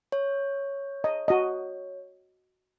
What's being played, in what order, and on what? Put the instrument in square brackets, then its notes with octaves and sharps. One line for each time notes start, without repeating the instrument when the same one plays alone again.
[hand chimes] C#5
[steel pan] D#5
F#4 D#5